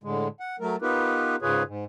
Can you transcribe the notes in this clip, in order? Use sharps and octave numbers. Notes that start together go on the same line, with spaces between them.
A2 D3 G#3
F#5
F#3 A3 A#4
B3 D#4 F4 G4 A#4 B4
G#2 C#3 F4 G#4 B4 C#5
G#2